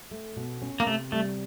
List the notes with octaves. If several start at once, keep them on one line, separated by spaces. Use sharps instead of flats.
A3
B2
C#4
A#3
C3 A3
G3 A3